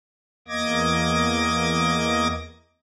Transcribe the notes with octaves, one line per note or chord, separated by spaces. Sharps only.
E2 A#3 D#5 D6 G#6 A#6